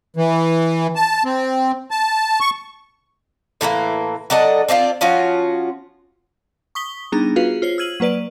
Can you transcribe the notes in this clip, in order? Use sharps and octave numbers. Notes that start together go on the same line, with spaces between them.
E3
A5
C4
A5
C#6
A2 E3 A3 A#3
F#3 D4 A4 D#5
C4 D4 E4 F4
F3 C#4 F4 F#4
C#6 D#6 B6 G7
G3 B3 D4 D#4 G#4 A#5
F4 F#4 G#4 B4 F5
F4 C5 C#5 C7
E6 F6 G#6 D#7 F#7
F#3 A#3 B4 D5 D#7